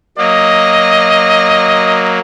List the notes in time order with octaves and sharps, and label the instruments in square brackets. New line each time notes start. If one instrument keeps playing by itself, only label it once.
[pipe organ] F#3 A#3 [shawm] D#5